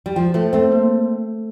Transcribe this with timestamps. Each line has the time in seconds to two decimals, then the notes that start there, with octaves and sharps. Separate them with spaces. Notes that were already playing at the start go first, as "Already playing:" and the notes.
0.06 G3
0.16 F3 G5
0.34 F3 A3 C5
0.53 A3 C4 C5
0.72 A#3